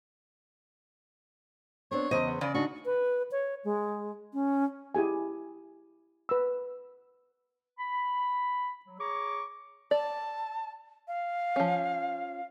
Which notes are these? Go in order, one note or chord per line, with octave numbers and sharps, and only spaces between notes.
B3 C4 D4 C#5
E2 C#3 C5 D#5
B3
C#3 D5
D4 D#4 F#4
B4
C#5
G#3
C#4
E4 G4 G#4 G#5
B4 E6
B5
F#3
G#4 C#5 A#5 C#6 D6
D5 A5
F5
F3 C#4